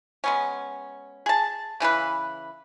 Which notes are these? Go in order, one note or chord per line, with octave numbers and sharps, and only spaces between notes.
G#3 B3 C#4
G#4 A5
C#3 E3 F#4 B4